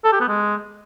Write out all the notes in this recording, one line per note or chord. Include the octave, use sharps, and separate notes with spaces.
A4
G4
B3
G#3